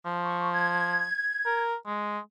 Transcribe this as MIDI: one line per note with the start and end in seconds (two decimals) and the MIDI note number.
0.05 1.06 53
0.24 0.49 85
0.52 1.60 92
1.45 1.75 70
1.86 2.19 56